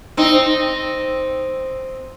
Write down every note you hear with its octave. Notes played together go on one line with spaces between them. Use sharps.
C4 D#4